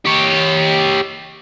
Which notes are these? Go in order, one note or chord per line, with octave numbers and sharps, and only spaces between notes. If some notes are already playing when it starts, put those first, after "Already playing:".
G4 C#5